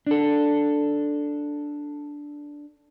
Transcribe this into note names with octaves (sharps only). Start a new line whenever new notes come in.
D4 A4